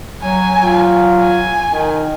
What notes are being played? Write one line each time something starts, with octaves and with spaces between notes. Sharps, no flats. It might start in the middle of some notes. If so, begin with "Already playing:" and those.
F#3 G#5
F4
G#5
D#3